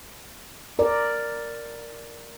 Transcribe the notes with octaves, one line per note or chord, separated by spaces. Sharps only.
A#4 D5